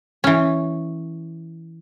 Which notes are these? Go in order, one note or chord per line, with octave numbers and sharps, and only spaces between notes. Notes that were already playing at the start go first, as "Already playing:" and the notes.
E3 C#4